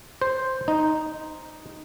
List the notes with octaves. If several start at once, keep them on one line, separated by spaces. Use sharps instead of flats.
C5
D#4